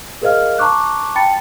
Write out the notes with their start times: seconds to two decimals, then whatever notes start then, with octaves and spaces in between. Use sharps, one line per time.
0.22 G#4 A#4 C5 D#5 F5 F6
0.58 A5 A#5 C#6 D6 F#6
1.15 G5 A5 B5 A6 C#7